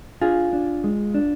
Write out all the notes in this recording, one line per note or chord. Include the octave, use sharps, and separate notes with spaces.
D4 F4 G#4
D4
G#3
D4